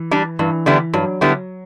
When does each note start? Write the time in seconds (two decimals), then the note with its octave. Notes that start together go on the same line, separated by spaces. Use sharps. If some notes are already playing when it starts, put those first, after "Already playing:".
Already playing: E3
0.11 G3 D4
0.39 G2 E3
0.66 D3 G3 B3 E4
0.93 G2 F#3
1.21 D3 G3 B3 E4